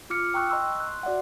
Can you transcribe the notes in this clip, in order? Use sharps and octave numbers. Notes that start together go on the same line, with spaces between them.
F4 D6 F6 C#7
G5 A#5 C#6 E6 F#6
D#5 A#5 C6 C#6 E6
C6 F#6
F#4 D5 E5 F#5